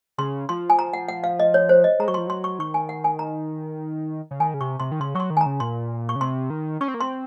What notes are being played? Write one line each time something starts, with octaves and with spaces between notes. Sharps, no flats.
C#3 C6
F3 C6
G#5
A#5
F#5
F#5
F5
D#5
C#5
C5
D#5
G#3 A#5
F#3 C#6
F3 C6
F#3 C6
C#6
D#3 C#6
G#5
F#5
G#5
A#5
C#3
D#3 G#5
C#3
C3 C#6
C3 C6
D#3
C#3 C6
F#3 C#6
C6
D#3
G#5
A#5
C#3
A#2 C6
C#6
C#3
C3 C6
D#3
C#4 C#6
C4
A#3
C4 C6